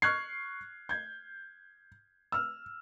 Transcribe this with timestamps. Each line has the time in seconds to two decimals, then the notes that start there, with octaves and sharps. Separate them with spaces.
0.02 C#6 F6 F#6 G#6 C7
0.89 G6 G#6
2.32 E6 F6